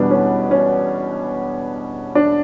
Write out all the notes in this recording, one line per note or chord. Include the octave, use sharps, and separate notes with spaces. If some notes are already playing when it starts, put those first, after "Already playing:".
Already playing: E2 B2 G3 B3 D4
C#4
C#4
D4